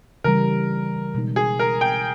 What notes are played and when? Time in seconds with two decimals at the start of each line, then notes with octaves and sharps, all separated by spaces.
0.24 C#3 E3 G3 A#4
1.15 B2 G#3 D#4
1.36 G#4
1.59 A#4
1.81 G5